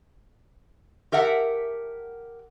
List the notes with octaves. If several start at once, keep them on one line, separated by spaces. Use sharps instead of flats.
G4 A#4 E5 F#5 A5